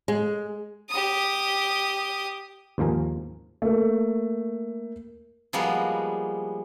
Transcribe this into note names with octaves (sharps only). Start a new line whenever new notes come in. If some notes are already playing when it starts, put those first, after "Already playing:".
G#3
G4 D#6
D#2 G#2 F3 A#4 G#5
A3 A#3
F3 G3 G#3 A#3 B3 F#4